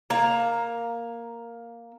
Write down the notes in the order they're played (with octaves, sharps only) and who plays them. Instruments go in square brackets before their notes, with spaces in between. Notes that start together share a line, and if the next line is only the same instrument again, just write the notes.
[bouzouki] A#3 A#5